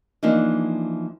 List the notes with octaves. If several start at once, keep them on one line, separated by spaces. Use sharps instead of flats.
E3 F3 A#3 D4 D#4